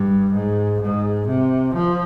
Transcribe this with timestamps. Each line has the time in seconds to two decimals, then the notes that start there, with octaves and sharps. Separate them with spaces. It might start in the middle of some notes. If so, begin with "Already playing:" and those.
Already playing: G2
0.33 G#2
0.81 G#2
1.27 C3
1.74 F3